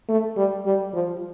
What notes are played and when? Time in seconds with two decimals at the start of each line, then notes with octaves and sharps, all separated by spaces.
0.09 A3
0.37 G3
0.66 G3
0.94 F3